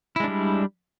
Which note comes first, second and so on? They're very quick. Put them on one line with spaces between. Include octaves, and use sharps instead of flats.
E4 G#3 D4 G3